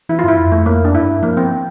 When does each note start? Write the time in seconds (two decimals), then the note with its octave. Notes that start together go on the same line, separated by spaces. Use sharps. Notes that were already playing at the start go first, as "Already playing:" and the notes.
0.09 E3 E4
0.19 F4
0.24 G2 E4
0.38 F2
0.52 A3
0.66 A#3
0.85 D4
0.94 G2 E4
1.22 F3 A#3
1.37 C4